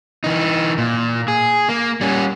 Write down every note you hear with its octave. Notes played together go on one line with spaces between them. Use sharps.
E3 D#4
A#2
G#4
A#3
G3 C#4